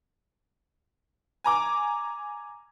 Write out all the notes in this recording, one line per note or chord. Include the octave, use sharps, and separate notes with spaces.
G#5 A#5 D6